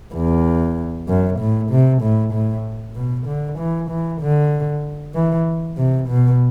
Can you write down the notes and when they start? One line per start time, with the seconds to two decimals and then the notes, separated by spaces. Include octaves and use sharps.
0.14 E2
1.08 F#2
1.39 A2
1.71 C3
2.02 A2
2.33 A2
2.96 B2
3.27 D3
3.58 E3
3.90 E3
4.21 D3
5.15 E3
5.77 C3
6.09 B2